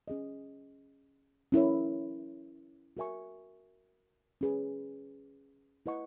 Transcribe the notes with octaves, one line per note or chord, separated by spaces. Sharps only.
C#4 G#4 D#5
C#4 E4 A#4 C#5
F#4 A#4 E5 G#5 C#6
C#4 G#4 B4
E4 B4 D#5 F#5 C#6